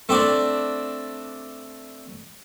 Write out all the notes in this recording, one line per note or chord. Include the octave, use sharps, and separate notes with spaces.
A3 C4 D4 D5